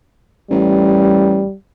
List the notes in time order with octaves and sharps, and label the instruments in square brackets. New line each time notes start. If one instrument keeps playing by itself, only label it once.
[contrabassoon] A1 [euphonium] G3